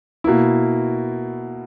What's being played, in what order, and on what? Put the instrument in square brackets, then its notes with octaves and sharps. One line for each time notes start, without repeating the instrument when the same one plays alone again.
[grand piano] B2 A#3 E4